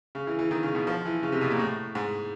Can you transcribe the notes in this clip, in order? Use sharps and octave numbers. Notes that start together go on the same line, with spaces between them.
C#3
E3
E3
D#3
C#3
B2
F3
E3
C#3
C3
B2
A#2
A2
G#2